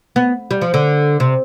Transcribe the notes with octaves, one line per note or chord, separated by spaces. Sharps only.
B3
G3
F3
D3
C3